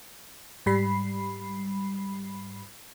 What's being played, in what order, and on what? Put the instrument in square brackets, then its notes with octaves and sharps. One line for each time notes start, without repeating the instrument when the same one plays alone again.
[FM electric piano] G#2 G3 B5 C7